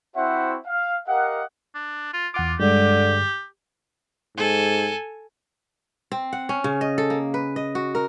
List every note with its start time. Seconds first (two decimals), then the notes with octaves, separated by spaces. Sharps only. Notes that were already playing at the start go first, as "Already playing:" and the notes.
0.17 C4 E4 F#4 C5 E5 F#5
0.67 F5
1.07 G4 A#4 D#5 F5 F#5
1.75 D4
2.14 F4
2.34 E2 F4 F#5 D6
2.59 G2 D3 G#3 G4
4.37 G#2 A4 G#5
6.12 C4
6.33 F#5
6.49 C#4
6.64 C#3
6.81 D#5
6.98 A4
7.10 A#3
7.34 B4
7.56 D#5
7.75 F#4
7.95 A#4